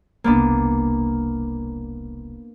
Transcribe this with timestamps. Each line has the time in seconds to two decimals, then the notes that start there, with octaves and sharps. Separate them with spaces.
0.24 E1 C2 A#3 B3 D4